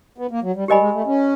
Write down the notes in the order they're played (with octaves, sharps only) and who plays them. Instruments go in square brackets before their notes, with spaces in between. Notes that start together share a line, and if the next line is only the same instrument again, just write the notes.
[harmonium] B3
A#3
F#3
G3
[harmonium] G3 [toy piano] G4 A#4 D#5 G#5 B5
[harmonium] G#3
A3
C#4